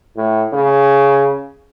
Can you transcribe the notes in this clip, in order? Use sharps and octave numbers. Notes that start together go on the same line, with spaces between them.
A2
C#3